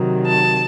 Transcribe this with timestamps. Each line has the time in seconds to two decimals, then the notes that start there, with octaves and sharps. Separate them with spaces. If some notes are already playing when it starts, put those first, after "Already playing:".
Already playing: C3 D#3 F#3
0.28 A5